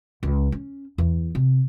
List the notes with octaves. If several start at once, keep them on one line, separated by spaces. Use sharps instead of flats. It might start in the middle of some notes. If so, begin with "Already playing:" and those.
C#2
C#4
E2
C3